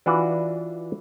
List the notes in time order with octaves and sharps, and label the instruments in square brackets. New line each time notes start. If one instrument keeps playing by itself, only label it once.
[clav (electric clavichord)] E3 D4 F4 F#4 B4